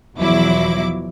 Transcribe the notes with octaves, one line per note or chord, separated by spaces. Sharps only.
E2 B2 F3 F#3 E4 D6